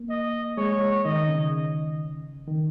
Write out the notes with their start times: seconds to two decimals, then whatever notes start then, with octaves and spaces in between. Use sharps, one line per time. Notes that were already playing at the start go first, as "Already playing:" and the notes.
Already playing: A#3
0.10 D#5
0.57 G#3 C#5
1.04 D#3 D#5
1.28 C#3
2.48 D#3